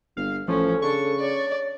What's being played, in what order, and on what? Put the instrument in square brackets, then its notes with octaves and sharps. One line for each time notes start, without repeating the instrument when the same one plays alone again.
[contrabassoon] G1 [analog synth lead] F5
[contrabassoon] A1 [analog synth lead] F3 [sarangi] C#4 [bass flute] A4
[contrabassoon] C#3 [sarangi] D4 [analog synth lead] C#6
[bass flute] C#5 [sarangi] D5